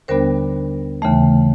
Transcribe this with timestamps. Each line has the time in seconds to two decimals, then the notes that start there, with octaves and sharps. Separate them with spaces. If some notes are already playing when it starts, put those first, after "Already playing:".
0.08 D#2 D3 G3 B3 D4 A#4 C5
1.02 D#2 C#3 E3 A3